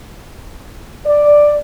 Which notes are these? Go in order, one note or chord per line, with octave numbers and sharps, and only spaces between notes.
D5